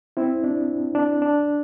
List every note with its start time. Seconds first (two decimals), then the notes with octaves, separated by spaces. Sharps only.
0.17 C4 E4
0.44 D4
0.95 D4
1.22 D4